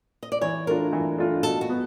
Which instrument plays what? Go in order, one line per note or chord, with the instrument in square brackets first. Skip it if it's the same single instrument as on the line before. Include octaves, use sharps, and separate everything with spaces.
[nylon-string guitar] D#5
D5
[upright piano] E3 [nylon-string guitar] C#5
[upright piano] A3 D4 F4 [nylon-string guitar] A#4
[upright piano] E3
A3 D4 F4
[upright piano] B2 [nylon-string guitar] A4
[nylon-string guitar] F#4
[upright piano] B3